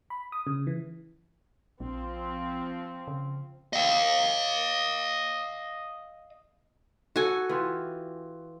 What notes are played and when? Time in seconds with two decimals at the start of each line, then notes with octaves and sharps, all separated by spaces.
0.10 B5
0.32 D#6
0.47 C#3
0.67 E3
1.80 A#1 F3 C4
3.08 C#3
3.73 D#5 F5
7.16 F#4 A4 G#5
7.49 E3 F4 G4